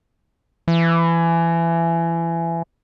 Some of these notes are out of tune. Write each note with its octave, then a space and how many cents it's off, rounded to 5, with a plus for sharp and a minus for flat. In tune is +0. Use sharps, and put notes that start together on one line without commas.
E3 +25